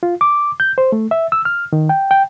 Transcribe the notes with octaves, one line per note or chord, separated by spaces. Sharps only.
F4
D6
G6
C5
A3
E5
E6
F6
D#3
G5
G5